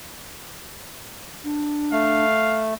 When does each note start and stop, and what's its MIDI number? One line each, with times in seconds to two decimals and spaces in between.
1.44 2.24 62
1.92 2.74 57
1.92 2.63 77